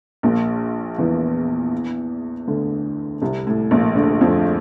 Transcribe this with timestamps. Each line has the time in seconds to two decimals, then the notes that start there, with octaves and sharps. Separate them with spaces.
0.23 A#1 A#2
0.98 E2 E3
2.47 D2 D3
3.22 C2 C3
3.47 A2
3.71 A#1 A#2
3.95 D2 D3
4.21 F2 F3